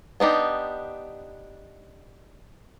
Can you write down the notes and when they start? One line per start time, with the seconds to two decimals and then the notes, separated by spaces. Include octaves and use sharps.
0.20 B3 D4 D#4 G4